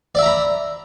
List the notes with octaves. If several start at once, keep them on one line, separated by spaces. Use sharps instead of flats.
D5 E5 A#5 B5